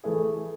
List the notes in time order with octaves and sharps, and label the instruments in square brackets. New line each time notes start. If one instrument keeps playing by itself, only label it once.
[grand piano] E3 A3 E4 G#4